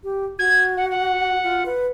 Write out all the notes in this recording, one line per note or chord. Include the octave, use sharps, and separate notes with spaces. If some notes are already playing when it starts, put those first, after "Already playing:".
G4
F#4 G#6
F#5
F#5
F4
B4